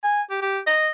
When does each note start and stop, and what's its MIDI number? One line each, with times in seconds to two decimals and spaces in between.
0.04 0.22 80
0.30 0.40 67
0.42 0.59 67
0.67 0.90 75